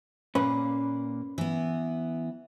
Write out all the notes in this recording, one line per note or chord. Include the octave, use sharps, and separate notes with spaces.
A#2 A#3 C#4 B4
E3 B3